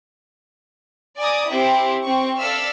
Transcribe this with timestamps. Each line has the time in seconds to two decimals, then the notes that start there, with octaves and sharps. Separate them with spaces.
1.18 D5 G#5 A#5 D6 D#6
1.49 C4 E4 G4 C5
2.02 C4 C#6
2.38 A4 D5 E5 F5 E6 F6